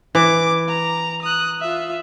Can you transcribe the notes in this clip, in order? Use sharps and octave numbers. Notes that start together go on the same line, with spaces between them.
E3 D6
A#5
D#6 F#6
F4 E5